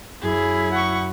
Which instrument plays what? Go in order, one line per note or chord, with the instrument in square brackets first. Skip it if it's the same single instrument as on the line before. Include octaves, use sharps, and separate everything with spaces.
[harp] F#2 [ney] E4 [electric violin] G#4
[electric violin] F#5 C#6